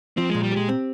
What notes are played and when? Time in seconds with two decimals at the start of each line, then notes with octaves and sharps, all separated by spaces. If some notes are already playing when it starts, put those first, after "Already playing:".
0.17 F3 C4
0.30 A#2 G#3
0.43 G3
0.52 G#3 G4
0.69 C4